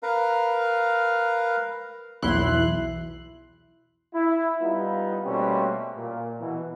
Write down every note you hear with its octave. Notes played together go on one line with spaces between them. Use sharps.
A#4 B4 F5 A#5
B1 E2 E4 C6 F#6
E4
G3 B3 D#4 F4
B2 G3 A3 A#3 C4 C#4
A#2
B2 E3